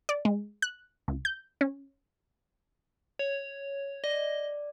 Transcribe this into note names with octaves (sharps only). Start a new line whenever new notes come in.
D5
G#3
F#6
C#2
G6
C#4
C#5
D5 D#5